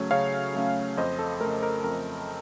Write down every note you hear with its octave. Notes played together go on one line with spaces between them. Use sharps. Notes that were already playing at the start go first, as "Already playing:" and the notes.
Already playing: C#3 F#3 A3 C#4 C#5
C#3 C#5 F5
F#3 A3 C#4
F2 C5 D#5
A4
C#3 A3 A#4
A#4
F2 A#4